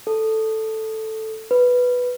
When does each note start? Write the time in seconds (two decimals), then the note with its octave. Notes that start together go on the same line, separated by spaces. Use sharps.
0.07 A4
1.51 B4